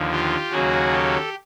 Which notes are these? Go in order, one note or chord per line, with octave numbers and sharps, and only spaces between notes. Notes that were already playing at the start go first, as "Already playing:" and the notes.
Already playing: D#2 D3 F3
F4 G4
D#2 C#3 F#3 A#3 F#4 G#4
G4 A4